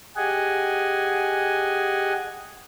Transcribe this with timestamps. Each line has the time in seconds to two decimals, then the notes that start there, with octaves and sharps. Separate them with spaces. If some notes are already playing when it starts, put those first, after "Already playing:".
0.16 G4 G#4 D#5 F#5 G#5